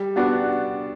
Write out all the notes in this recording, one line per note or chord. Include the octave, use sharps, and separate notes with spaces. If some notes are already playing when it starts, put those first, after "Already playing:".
Already playing: G3
B3 D4 F#4